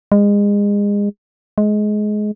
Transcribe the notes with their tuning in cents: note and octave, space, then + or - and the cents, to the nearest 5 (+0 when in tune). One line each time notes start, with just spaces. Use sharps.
G#3 -30
G#3 +20